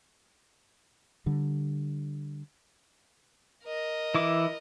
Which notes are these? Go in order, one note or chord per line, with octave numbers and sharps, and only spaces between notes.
D3 G3
A#4 D#5
E3 E4 D6